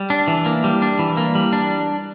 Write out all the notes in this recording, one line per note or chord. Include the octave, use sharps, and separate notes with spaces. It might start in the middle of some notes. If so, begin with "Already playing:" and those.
Already playing: G3
D4
E3
A#3
G3
D4
E3
A#3
G3
D4